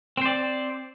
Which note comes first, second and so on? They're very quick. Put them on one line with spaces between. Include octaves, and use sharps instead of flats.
C4 C5 D5